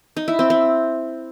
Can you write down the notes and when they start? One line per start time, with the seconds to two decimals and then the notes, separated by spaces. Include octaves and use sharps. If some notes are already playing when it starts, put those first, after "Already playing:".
0.17 D#4
0.28 E4
0.39 C4
0.50 C4